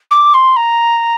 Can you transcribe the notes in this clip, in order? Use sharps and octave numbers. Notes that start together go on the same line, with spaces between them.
D6
C6
A#5